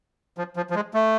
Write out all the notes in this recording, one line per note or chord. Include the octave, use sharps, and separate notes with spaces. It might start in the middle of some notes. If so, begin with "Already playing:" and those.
F3
F3
F3
G#3
A3